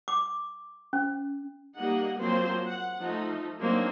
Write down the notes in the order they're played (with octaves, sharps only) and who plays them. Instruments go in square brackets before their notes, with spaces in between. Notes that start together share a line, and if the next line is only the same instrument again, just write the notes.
[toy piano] D6
C#4
[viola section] G3 A#3 D#4 D#5 F#5
F3 F#3 A#3 C4 C5
F#5
F3 A3 D#4
F#3 A#3 C4 D4 D#4